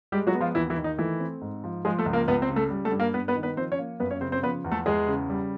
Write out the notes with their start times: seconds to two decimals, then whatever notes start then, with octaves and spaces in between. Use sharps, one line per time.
0.12 G3 G#3 G4
0.27 F#3 F#4
0.34 B3
0.41 F3 F4
0.55 D#2 E3 E4
0.70 E3 E4
0.77 D#3
0.84 D#4
0.98 E3 A3 E4
1.20 C4
1.41 G#2
1.64 F3
1.85 F3 G#3 G#4
1.99 A3 A4
2.06 C#2
2.13 A#3 A#4
2.28 C#2 B3 B4
2.42 C4 C5
2.49 C#3
2.56 A3 A4
2.70 G3
2.85 A3 A4
2.92 G2
3.00 A#3 A#4
3.14 G2 B3 B4
3.28 B3 B4
3.36 D#3
3.43 B3 B4
3.56 F3 C4 C5
3.72 C#4 C#5
3.79 A#3
4.00 F#2 B3 B4
4.11 C#4 C#5
4.21 C#3 C4 C5
4.32 C4 C5
4.43 F3 B3 B4
4.64 E2
4.72 A3 A4
4.86 E2 G#3 G#4
5.07 C#3
5.30 G3